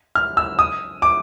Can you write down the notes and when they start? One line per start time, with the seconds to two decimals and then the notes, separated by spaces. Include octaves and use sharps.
0.15 F6
0.37 E6
0.59 D#6
1.02 D6